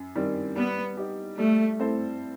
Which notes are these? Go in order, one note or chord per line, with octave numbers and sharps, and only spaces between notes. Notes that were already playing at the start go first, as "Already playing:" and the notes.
Already playing: F#2
D#3 G3 C4
G3 B3
D#4 G4
G3 A3
C4 E4 A4 C5